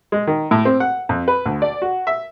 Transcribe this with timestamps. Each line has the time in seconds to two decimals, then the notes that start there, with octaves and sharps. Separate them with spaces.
0.12 G#3
0.27 D#3
0.51 A2
0.65 C4
0.80 F#5
1.09 F2
1.28 B4
1.46 D2
1.62 D5
1.82 F#4
2.07 E5